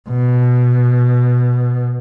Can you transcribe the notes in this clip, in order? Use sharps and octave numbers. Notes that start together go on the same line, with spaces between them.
B2